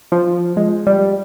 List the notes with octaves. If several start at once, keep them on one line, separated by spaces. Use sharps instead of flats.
F3
G#3
G3